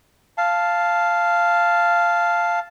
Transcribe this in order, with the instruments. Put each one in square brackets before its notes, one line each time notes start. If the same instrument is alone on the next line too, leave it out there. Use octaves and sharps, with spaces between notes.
[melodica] F5 A5